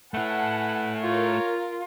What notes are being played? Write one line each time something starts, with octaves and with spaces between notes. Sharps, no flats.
A3 E4 B4 F#5 G#5 A5
F4 A#4 C#5